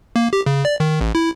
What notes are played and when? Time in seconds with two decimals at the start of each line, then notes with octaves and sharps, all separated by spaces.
0.16 A#3
0.33 G4
0.46 C#3
0.65 D5
0.80 D#3
1.01 A1
1.15 E4